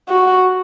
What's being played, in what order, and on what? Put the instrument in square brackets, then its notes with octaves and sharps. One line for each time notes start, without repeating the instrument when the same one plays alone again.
[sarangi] F#4